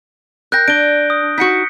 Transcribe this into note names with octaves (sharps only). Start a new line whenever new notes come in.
A#4 G5 F#6 G6 A#6
D4 D7 G7
D#6
D#4 F#4 B6 C#7